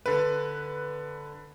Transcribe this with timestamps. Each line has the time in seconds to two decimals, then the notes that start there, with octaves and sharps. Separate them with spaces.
0.06 D3 B4